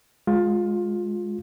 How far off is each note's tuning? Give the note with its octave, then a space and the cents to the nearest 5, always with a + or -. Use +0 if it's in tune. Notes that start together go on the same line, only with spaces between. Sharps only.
G#3 +0 F4 +20